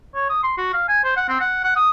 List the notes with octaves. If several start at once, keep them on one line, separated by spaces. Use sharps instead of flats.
C#5
D#6
C6
F#4
F5
G#5
C5
F#5
C4
F#5
F#5
D#6